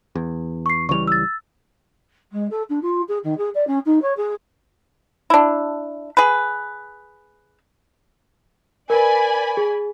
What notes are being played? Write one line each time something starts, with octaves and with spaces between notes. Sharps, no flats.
E2
C#6 C7
C#2 E3 G3 C#6 F7
E6 A6
G#3
A4
D4
F4
G#4
D#3
G#4
D5
C#4
D#4
C#5
G#4
D4 E4
G#4 B4
A#4 B4 D5 G#5 B5
G#4